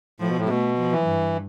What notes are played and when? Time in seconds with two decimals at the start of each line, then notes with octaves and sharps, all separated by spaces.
0.20 A2 F3
0.28 B2
0.38 A2
0.45 C3
0.49 B2 A3
0.78 F3
0.92 E3
1.07 G2